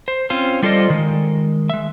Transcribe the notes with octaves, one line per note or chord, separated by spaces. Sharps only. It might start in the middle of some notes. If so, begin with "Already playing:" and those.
C5
C4 C#4 F4 C5
G3 F4 A4 C5 D5 D#5
D#3 G#3
G#3 E5